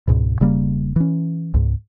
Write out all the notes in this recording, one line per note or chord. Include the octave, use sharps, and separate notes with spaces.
C#2 G#2 B2
E1 C#3 G3 A#3
E3 C#4
C#2 G#2